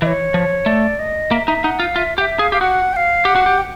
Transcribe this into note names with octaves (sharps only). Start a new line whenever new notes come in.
E3 D#5
C#5
F3
A3 D5
D#5
A#3 E5
D#4 E5
D#4 F#5
F4 F5
F4 E5
G4 F#5
E5
G#4 F5
G4 F5
F#4 F#5
G5
F5
G4 F#5
F#4
G4
G5